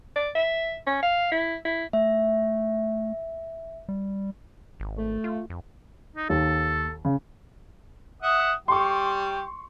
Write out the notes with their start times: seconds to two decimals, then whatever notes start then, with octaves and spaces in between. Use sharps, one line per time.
0.16 D5
0.35 E5
0.87 C#4
1.03 F5
1.32 E4
1.65 E4
1.93 A3 E5
3.89 G3
4.80 G#1
4.96 A3
5.24 F4
5.50 F2
6.16 D#4
6.29 D#2 A4
7.05 C#3
8.22 E5 F#5 D#6
8.68 G3 G4 C6 C#6